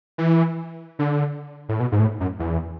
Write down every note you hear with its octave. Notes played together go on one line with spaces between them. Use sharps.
E3
D3
A2
B2
G#2
A2
F#2
E2